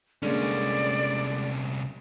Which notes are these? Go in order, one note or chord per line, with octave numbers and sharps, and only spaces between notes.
C2 D3 G#3 A#3 C#4 D5